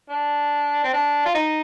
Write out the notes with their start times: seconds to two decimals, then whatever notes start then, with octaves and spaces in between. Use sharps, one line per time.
0.09 D4
0.84 C4
0.93 D4
1.26 F4
1.34 D#4